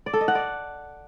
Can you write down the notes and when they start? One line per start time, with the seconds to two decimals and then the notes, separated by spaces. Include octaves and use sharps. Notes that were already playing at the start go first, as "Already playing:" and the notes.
0.06 D5
0.14 A4
0.21 D#5
0.28 F#5
0.35 D5